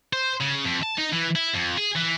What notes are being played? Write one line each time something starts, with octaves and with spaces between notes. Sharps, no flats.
C5
C#3
F2
A5
D#4
E3
E4
F2
G#4
E3